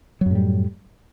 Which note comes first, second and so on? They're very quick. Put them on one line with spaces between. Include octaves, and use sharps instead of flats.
F#3 F#2 A2 G3